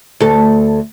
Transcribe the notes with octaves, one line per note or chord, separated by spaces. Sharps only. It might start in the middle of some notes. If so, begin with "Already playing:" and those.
D2 A4